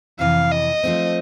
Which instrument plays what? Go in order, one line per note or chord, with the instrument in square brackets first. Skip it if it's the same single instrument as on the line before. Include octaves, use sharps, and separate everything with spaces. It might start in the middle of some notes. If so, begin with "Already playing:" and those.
[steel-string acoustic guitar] F2 C3 E3 [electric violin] F5
[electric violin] D#5
[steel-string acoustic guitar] F3 A3 C4